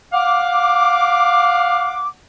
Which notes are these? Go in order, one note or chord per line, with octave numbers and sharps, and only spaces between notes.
F5 F#5 D6